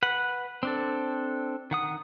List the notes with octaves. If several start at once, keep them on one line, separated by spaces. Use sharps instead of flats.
B4 F#5
C4 D4 A4
D#3 F#5 D#6